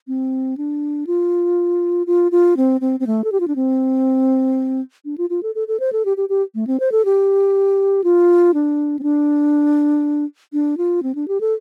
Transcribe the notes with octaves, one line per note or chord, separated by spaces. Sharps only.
C4
D4
F4
F4
F4
C4
C4
C4
A3
A4
G4
F4
D4
C4
D4
F4
F4
A4
A4
A4
C5
A4
G4
G4
G4
A3
C4
C5
A4
G4
F4
D4
C4
D4
D4
F4
C4
D4
G4
A4